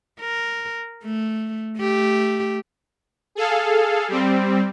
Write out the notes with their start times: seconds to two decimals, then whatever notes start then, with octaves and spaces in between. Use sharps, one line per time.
0.20 A#4
1.04 A3
1.77 A3 G4
3.35 G#4 A4 F5
4.08 G3 C4